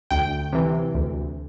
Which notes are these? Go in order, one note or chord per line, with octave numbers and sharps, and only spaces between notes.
D2 G5
C3 E3
D2